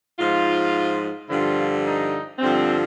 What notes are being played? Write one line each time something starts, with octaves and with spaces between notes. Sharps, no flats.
G#2 F3 F4
G2 D3 F3 F4
D#4
G2 D3 F3 C4